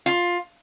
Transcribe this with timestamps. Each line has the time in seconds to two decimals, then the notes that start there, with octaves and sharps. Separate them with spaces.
0.06 F4